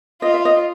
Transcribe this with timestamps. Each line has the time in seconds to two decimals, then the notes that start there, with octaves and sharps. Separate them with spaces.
0.22 F4 D#5
0.34 E5
0.45 D#5